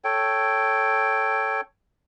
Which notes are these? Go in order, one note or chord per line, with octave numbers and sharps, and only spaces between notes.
A4 C#5 G5